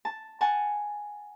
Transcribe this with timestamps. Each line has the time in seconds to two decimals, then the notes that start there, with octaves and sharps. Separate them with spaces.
0.05 A5
0.41 F#5 G#5 A5